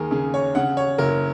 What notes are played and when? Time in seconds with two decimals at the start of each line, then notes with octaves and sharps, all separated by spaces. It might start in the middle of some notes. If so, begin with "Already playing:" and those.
Already playing: D#2 G#4 A#4
0.11 C#3 G#4
0.34 C#5
0.55 C#3 F#5
0.77 C#5
0.98 F#1 A#4